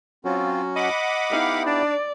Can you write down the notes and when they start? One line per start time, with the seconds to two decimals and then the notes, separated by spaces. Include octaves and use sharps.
0.25 F#3 C4 C#4 F4 F#4
0.76 D#5 F#5 B5 D6
1.31 B3 D#4 E4 G4 F5
1.66 D4 D5